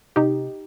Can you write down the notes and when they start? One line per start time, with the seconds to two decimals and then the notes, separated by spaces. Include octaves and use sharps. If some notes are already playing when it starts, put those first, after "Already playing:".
0.16 C3 D#4 G4